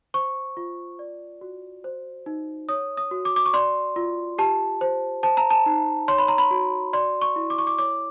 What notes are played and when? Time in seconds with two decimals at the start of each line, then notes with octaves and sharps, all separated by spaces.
0.14 C5 C#6
0.57 F4
0.99 D5
1.41 F#4
1.84 C5
2.26 D#4
2.69 C#5 D#6
2.97 D#6
3.11 F#4
3.25 D6
3.36 D6
3.46 C#6
3.53 D5 C6
3.96 F4
4.38 G4 A5
4.81 C5
5.23 C5 A5
5.37 A#5
5.50 A5
5.66 D#4
6.08 C#5 C6
6.18 B5
6.28 A#5
6.38 B5
6.51 F#4
6.93 D5 C6
7.22 C#6
7.36 E4
7.50 D6
7.58 C#6
7.67 D6
7.78 C#5 D6